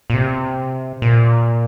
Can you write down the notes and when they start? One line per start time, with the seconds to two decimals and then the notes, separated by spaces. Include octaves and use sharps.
0.10 A#2
0.14 C3
1.02 A#2